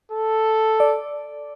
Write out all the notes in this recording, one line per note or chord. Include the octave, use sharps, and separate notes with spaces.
A4
D5